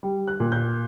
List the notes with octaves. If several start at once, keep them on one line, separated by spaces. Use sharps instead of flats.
G3
F#6
A#2
G6